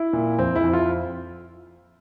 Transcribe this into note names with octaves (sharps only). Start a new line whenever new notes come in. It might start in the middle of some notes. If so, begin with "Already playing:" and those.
Already playing: E4
A#2
F2 C4
E4
F2
F4